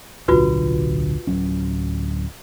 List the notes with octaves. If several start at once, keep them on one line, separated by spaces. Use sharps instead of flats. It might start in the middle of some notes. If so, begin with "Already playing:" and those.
D1 B1 D3 F4 F#4 B4
D1 F#3 C#4